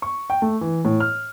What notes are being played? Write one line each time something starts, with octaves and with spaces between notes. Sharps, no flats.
C#6
G5
A3
E3
A2
F6